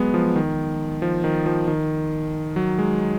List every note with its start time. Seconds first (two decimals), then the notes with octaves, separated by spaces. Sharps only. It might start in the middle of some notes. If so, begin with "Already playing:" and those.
Already playing: F#3 G#3 B3
0.14 F3
0.36 D#3
1.02 F3
1.24 D#3
1.46 F3
1.68 D#3
2.56 F#3
2.79 G#3